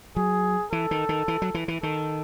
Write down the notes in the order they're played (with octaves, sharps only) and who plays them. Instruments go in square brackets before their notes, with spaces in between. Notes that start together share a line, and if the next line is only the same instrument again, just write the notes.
[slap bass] F#3 [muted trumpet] G#4
[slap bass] E3 [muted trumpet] A4
[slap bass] D#3
D#3
E3
F#3
E3
E3
[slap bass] D#3 [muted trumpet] A4